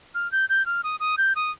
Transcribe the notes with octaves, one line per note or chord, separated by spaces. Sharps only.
F6
G6
G6
F6
D#6
D#6
G6
D#6